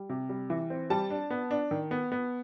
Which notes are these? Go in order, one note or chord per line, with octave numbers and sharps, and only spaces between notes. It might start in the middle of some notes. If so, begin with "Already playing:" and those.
Already playing: G3
C3
G3
E3
C4
G3 A5
D4
B3
D4
D#3
B3
B3